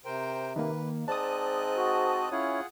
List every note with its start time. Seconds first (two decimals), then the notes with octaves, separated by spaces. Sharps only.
0.05 C3 A#4 C5 G5
0.56 D#3 A#3 B4
1.08 G#2 C4 D5 D#5 A5 D#6 F#6
1.77 F#4
2.32 C#4 E4 F4 G#4 C#5 F#5